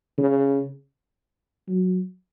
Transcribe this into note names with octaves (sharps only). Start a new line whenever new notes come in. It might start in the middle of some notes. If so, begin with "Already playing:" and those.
C#3
F#3